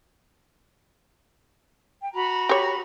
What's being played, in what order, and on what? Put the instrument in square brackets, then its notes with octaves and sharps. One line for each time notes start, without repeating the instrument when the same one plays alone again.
[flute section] G5
F#4 A#5 B5
[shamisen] G4 C#5